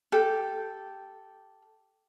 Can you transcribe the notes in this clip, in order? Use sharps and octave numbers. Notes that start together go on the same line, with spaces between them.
G4 A4